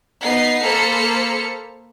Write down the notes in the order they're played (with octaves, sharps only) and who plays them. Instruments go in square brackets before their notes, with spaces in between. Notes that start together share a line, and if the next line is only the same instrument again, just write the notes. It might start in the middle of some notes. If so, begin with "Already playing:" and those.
[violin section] B3 D#4 C7
A#3 A4 C5 B5 F6 C#7